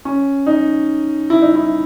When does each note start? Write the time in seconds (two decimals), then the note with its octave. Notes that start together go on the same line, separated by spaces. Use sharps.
0.05 C#4
0.46 D#4
1.30 E4
1.42 D#4
1.55 E4